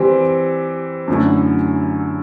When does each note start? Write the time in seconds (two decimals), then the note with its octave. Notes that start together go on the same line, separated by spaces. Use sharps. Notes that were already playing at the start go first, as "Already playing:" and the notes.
Already playing: E3 G3 C4 G4
1.08 F#2 D3 F#3 A3 E4